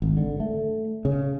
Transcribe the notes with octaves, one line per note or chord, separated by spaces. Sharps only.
G#1
D3
A3
C#3